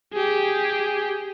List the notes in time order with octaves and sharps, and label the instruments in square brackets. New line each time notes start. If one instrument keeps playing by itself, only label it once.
[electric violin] G4 G#4